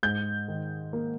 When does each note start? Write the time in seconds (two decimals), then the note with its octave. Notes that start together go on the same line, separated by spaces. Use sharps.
0.03 G#2 G6
0.48 D#3
0.93 A#3